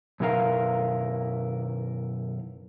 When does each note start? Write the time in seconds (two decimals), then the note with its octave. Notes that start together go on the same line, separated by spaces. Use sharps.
0.20 F#2 B2 E4 A#4 F5